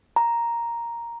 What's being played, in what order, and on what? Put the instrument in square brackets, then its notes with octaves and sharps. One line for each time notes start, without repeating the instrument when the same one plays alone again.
[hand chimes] A#5